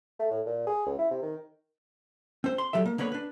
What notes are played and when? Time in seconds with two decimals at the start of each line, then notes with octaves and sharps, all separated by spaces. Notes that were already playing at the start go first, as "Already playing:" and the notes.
0.19 A3
0.31 A2
0.46 A#2
0.67 G#4
0.86 C#2
0.98 E4
1.11 C3
1.22 D#3
2.44 C4 C5
2.58 C6
2.73 F#3 G3 A4 E5
2.86 A#3
2.98 D3 A#3 B3 B4 C#5
3.12 D4 B4